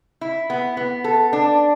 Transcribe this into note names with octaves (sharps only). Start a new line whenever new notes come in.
E4
B3
B3
A4
D4